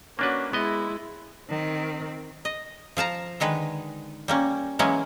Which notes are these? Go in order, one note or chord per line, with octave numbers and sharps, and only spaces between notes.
A#3 C#4 D4 F#4 B4
G#3 B3 E4 D#5
D#3 C4
D#5
F3 F5 A5 A#5
D3 D#3 G#3 B4
G3 A#3 C#4
E3 F#3 G#3 A#3 C#4